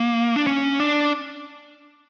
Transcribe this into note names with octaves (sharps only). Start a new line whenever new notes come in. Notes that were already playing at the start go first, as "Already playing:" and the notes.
Already playing: A#3
D4
C#4
D4